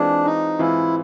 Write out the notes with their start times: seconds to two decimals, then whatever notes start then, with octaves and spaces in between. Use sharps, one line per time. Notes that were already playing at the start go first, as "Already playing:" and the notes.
Already playing: E3 G#3 C4 D4 F4 G#4
0.25 D#4
0.59 E3 G#3 C4 E4 F4 G#4